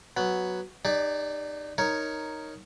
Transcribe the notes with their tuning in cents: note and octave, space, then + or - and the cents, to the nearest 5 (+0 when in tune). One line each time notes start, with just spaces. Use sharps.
F#3 +0 B3 +0
D#4 -30 G4 +35 D5 -5
D#4 +0 A#4 +0 C#5 +5